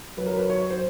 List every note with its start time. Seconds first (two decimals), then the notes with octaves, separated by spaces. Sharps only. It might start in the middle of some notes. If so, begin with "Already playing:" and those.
0.18 F#3 B4
0.26 A#4
0.37 B4
0.50 C#5
0.71 C5